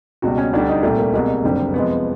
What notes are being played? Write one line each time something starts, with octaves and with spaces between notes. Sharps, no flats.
C#2 B2 G3 F#4
C#4
D2 D3 G3 D4
D#4
C2 A#2 G3 A3
A#3
C2 B2 G#3 A#3
F#1 F2 D3 G3
F2 C3 F3 G#3 B3